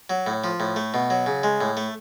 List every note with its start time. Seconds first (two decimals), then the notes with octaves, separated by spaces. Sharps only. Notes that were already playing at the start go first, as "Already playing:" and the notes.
0.10 F#3
0.26 A2
0.44 F3
0.60 A2
0.76 A3
0.94 B2
1.10 F#3
1.26 C#3
1.43 G#3
1.61 A2
1.77 A3